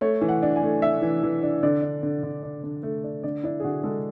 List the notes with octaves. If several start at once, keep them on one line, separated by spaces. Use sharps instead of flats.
A3 C#5
E3
F#5
D4
G#5
A3
D4 E5
E3
E3
D4
D3 D5
D4
D3
D3
D4
D3
A3
D4
D3 D5
D4 E4
G#4
D3 F#4
G#3 A4